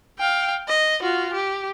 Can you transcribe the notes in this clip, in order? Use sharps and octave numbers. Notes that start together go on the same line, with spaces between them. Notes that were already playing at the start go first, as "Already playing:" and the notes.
F5 G5
D#5
F4 F#4
G4